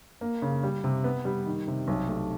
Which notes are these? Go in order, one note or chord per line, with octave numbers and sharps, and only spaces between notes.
A#3
C#3
G3
C3
B3
G3
D#3
C3
B1
A3